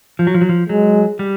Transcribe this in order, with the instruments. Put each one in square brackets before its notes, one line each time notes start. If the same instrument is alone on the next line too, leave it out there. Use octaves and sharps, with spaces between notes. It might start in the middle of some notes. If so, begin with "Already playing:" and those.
[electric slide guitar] F3
F#3
F3
F#3
F3
[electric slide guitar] F#3 [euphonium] G#3
[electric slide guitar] G3